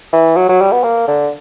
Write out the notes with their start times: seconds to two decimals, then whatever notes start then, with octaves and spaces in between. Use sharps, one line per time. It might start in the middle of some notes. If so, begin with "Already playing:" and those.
0.13 E3
0.36 F#3
0.49 F#3
0.61 G3
0.72 B3
0.84 A#3
1.08 D3